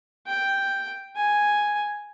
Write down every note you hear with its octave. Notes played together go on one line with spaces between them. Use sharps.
G5
G#5